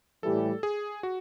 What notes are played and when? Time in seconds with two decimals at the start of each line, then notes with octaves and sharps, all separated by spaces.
0.23 A2 E3 G3 A4
0.63 G#4
1.03 F#4